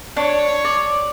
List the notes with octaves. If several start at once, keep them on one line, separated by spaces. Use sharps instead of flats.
D4 C#5
D5